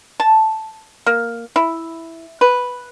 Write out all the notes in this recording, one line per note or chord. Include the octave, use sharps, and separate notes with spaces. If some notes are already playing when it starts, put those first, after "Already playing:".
A5
A#3
E4
B4